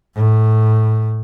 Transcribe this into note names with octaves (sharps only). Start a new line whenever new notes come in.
A2